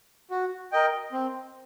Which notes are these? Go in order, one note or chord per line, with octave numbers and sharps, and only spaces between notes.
F#4
A#4 D#5 G5
C4